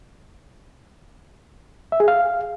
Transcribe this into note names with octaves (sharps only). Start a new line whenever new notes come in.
E5
G#4
F5